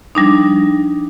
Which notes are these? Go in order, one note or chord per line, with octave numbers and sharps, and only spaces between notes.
F3 G3 D4 D#4